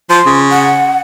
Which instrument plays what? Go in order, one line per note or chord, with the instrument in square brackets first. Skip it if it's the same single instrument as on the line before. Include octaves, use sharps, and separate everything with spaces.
[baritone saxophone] F3 [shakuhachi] C6
[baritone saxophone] C#3
[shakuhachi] F#5